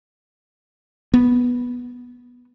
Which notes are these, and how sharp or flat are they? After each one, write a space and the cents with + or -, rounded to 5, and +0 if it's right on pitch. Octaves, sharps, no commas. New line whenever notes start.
B3 -10